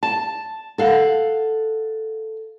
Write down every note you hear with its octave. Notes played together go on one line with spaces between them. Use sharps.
A5
A4 F5 F#5